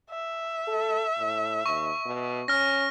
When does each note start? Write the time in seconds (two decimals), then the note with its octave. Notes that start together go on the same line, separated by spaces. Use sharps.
0.10 E5
0.67 A4
1.18 A2
1.66 D#2 C#6
2.06 B2
2.48 C#4 F6 A#6